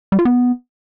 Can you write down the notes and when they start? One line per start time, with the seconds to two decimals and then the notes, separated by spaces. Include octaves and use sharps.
0.12 G3
0.19 F4
0.25 B3